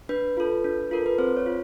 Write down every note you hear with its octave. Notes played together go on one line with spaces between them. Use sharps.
D4 B4
F4 A4
D4
F4 A4 A#4
B4
C4 C5
C#5
F4